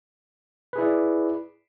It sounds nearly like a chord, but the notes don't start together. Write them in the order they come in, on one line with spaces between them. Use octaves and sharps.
B4 G#4 E4 D5